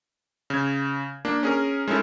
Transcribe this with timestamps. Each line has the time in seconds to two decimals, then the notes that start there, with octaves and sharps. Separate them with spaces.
0.50 C#3 G#6
1.25 A#3 D4
1.43 C#4 G#4 A#4
1.88 G#3 C#4 D#4 E4 A4 A#4